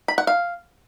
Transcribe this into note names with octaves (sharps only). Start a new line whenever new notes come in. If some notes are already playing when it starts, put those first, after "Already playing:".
B5
F#5
F5